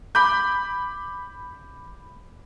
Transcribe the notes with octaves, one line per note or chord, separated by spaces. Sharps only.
B5 D6 G6